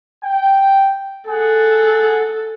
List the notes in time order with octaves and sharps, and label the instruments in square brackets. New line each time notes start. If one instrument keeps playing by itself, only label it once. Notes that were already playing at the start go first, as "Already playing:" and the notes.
[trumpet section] G5
[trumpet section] G#4 F#5 [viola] A4